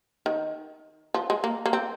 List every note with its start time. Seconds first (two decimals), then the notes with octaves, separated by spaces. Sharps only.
0.26 D#3
1.14 F3
1.30 G#3
1.44 A#3
1.66 A#3
1.73 C4